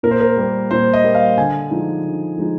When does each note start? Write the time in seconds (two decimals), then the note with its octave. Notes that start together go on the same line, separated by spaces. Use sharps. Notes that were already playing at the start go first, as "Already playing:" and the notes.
0.03 A#2 A#4
0.11 C5
0.20 A#4
0.37 G3 A#3
0.71 A#2 C5
0.93 D#5
1.04 G3 A#3
1.15 F5
1.38 D3 G#5
1.71 F3 G#3 D#4
2.04 D3
2.38 F3 G#3 D#4